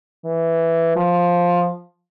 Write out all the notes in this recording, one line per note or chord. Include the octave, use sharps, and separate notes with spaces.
E3
F3